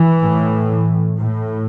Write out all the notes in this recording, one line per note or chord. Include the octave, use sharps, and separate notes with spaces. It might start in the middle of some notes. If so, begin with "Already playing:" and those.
Already playing: E3
A2
A2